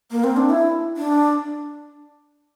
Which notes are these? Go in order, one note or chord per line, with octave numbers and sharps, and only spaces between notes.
A#3
C4
D4
E4
D4